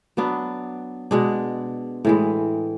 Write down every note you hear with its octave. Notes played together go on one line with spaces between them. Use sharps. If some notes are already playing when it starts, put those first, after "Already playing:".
F#3 B3 D4
B2 G#3 D4
A2 E3 G#3